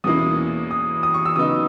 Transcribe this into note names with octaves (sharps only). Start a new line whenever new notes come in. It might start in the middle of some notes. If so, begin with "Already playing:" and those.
E2 B2 A#3 C#4 E4 D#6
D#6
D#6
C#6
E6
C#3 F#3 B3 D#4 D#6